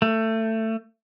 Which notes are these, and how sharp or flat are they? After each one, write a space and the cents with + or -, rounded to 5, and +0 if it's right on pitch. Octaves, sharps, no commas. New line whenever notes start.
A3 +20